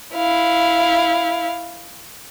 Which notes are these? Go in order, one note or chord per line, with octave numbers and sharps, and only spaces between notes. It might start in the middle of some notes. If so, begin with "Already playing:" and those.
E4 F5